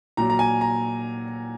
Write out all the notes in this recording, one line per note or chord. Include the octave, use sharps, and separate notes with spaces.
A#2 F#3 A#5
A#5
G#5
A#5